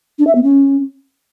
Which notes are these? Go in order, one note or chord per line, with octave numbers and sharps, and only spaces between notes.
D4
E5
B3
C#4